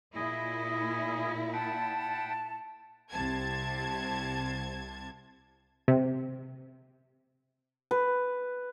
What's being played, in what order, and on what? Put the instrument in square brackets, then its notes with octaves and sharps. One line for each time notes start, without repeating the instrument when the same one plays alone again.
[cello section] A#2 E4 [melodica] G#4 D#5 G#5
[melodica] F#5 G5 B5 [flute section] A5
[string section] C2 C3 A5 G#6
[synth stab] C3
[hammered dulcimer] B4